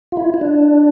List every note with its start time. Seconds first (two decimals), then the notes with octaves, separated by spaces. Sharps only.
0.12 F4
0.17 E4
0.34 E4
0.41 D4